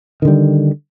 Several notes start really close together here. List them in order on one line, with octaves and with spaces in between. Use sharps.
D#3 D3 G3